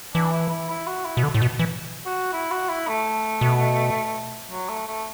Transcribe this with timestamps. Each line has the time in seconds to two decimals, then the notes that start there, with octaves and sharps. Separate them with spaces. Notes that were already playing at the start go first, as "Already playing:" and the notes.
0.14 E3 D4
0.32 E4
0.50 E4
0.70 E4
0.87 F#4
1.05 E4
1.17 B2
1.23 D3
1.35 A2
1.42 B2
1.59 E3
2.06 F#4
2.33 E4
2.51 F#4
2.69 E4
2.88 A3
3.41 B2
4.51 F#3
4.69 A3
4.87 A3